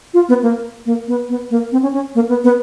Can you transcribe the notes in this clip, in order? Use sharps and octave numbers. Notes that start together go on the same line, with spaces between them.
F4
B3
A#3
A#3
B3
B3
A#3
C4
C#4
C#4
A#3
B3
B3